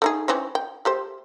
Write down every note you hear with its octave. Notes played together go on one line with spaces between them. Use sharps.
A3 D#4 G#4
E3 C4 C#4
G5
A3 G4 C5